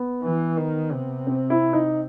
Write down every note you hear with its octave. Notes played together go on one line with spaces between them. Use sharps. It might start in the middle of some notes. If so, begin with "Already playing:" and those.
Already playing: B3
E3
D#3
C3
C4
E4
D#4